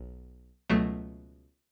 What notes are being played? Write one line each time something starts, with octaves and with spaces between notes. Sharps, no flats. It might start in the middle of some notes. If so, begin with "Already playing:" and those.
Already playing: B1
C#2 B2 F#3 A3